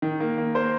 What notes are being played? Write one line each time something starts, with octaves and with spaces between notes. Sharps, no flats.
D#3
A#3
A#3
A#3 C5